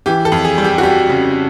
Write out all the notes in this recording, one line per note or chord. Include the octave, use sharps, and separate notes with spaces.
E3 G4
A4
F2
G#4
G3
G4
F#4
G3 G4
C#3